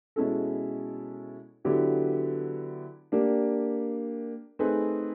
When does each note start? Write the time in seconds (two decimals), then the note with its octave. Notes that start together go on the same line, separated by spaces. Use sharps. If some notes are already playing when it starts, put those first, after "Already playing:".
0.16 B2 G#3 C#4 E4 A4
1.65 D3 F#3 B3 E4 G4
3.12 A#3 D4 G4
4.59 A3 C4 D#4 G#4 B4